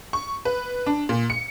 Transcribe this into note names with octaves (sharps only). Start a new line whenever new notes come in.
C#6
B4
D4
A#2
C#7